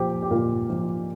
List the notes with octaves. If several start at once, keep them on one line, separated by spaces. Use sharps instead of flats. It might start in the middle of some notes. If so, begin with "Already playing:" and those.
Already playing: A#2 F3 G4 C5
G4
A#2 F4 A#4
F3 F4